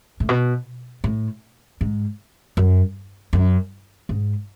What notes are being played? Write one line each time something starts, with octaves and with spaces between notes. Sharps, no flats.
A2
B2
A2
G#2
F#2
F#2
G#2